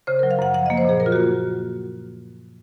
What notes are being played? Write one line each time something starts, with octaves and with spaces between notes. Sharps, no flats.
C#3 C5
F#3 A#4
F5
F#2 F#5
F3 F#5
A#3 D#5
C5
A#2 G#4
F#3 A#4
F4
F#4
A#3
F#4